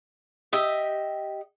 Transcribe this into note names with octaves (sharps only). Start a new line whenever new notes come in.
G4 D#5 E5